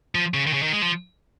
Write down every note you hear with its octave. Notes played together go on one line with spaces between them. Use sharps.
F3
C#3
D#3
C#3
D#3
G#3
F3